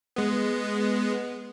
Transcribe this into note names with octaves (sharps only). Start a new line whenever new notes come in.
G#3 B3